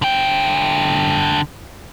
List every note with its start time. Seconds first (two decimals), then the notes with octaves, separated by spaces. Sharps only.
0.02 D3 G5